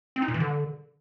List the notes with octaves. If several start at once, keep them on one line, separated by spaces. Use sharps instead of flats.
C4
D#4
A#2
E3
D3